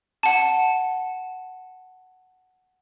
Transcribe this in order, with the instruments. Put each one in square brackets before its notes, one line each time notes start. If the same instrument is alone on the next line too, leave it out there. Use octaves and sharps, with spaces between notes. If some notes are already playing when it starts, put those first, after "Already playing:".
[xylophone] F#5 A5